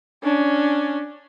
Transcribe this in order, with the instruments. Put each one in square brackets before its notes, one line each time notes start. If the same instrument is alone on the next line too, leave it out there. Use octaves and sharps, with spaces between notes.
[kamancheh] C#4 D4